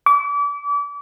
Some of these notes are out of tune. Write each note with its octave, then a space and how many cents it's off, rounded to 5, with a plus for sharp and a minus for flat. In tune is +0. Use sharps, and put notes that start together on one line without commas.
D6 -35